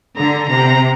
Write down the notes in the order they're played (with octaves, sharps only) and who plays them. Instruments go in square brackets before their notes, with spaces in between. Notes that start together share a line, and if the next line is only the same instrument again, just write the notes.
[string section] D3 [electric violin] A#5
[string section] C3 [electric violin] A#5